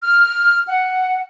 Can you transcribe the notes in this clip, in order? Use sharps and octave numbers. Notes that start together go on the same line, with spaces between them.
F6
F#5